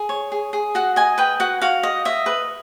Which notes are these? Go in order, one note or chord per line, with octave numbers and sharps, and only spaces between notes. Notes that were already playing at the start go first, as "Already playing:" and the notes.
Already playing: G#4
C#5
G#4
G#4
F#4 F#5
D#5 G#5
B4 G5
F#4 F#5
F#4 F5
D#5
D#5 E5
B4